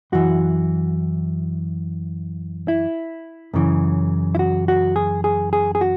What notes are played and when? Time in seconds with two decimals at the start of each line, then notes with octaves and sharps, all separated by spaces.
0.12 F#2 E3 F#4
2.68 E4
3.54 F#2 C#3 E3
4.35 E4
4.39 F#4
4.68 F#4
4.96 G#4
5.24 G#4
5.53 G#4
5.75 G#4
5.81 F#4